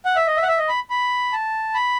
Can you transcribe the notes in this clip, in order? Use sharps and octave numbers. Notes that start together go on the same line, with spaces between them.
F#5
E5
D#5
E5
F#5
E5
D#5
B5
B5
A5
B5